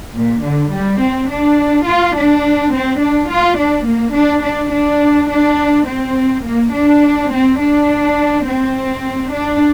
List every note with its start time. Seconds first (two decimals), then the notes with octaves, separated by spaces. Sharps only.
0.14 A#2
0.42 D3
0.71 G3
1.01 C4
1.29 D4
1.86 F4
2.15 D4
2.72 C4
3.01 D4
3.30 F4
3.58 D4
3.86 A#3
4.15 D4
4.44 D4
4.73 D4
5.30 D4
5.87 C4
6.45 A#3
6.73 D4
7.31 C4
7.60 D4
8.46 C4
9.31 D4